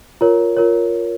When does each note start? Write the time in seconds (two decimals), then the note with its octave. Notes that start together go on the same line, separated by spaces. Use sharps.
0.21 F4 A#4 C#5
0.57 F4 A#4 C#5